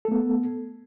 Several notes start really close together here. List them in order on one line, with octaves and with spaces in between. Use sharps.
A4 A3 B3